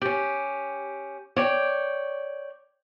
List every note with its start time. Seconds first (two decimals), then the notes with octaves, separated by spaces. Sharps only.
0.02 C#4 G4
1.36 C#5 D5 G5